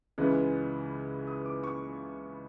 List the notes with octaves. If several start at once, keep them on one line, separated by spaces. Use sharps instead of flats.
C#2 C#3 E3 G#3 B3
D#6
D6
C#6